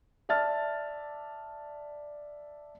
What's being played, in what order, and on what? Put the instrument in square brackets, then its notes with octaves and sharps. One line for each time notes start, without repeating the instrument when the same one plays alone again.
[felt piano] D5 E5 A5 F6 A6